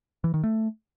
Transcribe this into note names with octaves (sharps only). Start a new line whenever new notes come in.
E3
D#3
A3